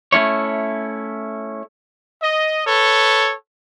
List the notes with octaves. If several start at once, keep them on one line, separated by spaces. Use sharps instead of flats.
A3 C#4 E4 C#5
D#5
A4 B4 C#5